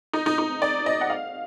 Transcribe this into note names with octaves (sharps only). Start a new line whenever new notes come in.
D#4
D#4
D#4
D5
D#5
F#5
F5